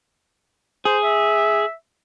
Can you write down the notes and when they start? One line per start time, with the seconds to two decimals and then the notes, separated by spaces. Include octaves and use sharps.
0.85 G#4 C5
1.04 E5